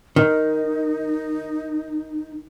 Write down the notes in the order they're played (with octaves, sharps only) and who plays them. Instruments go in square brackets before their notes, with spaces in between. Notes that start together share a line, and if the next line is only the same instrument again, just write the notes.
[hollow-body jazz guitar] D#3 [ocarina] D#4